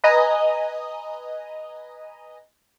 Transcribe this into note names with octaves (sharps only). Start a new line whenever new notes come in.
B4 D#5 G#5 A#5 D#6